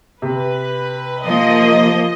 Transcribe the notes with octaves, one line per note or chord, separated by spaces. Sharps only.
C3 B4
F3 A#3 D#5